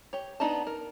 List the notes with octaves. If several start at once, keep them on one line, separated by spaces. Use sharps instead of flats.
G4 C#5
B3 D4 D#4 D#5 A5
A#4